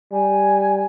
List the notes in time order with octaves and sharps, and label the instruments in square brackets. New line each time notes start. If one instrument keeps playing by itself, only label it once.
[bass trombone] G3 [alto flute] G#5